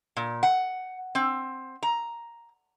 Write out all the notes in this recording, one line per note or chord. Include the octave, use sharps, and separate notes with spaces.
A#2
F#5
C4
A#5